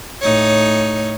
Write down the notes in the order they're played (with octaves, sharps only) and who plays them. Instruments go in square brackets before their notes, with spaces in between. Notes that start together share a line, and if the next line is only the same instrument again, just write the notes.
[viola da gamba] A2 D#4 C#5